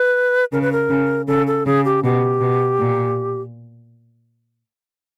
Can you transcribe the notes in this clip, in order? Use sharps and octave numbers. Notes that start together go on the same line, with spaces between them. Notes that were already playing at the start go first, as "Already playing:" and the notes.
Already playing: B4
C#3 A#4
B4
A#4
C#3
C#3 A4
A4
C#3 G#4
G4
B2 G4
B2
A#2